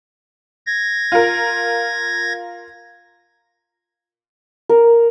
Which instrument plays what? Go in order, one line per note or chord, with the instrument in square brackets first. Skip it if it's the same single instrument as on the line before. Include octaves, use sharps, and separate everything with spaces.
[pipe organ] G#6 A#6
[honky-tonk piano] F4 A#4
[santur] A#4